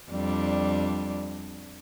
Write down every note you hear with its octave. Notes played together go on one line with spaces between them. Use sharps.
F2 G3 D4